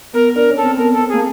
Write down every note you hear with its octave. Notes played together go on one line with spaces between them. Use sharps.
B3 A#4
D4 A#4
C#4
A4
C4
B3 A#4
A4
C4
G#4
A#3